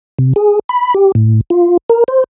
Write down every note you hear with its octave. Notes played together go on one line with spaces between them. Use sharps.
C3
G#4
B5
G4
A2
F4
A#4
C5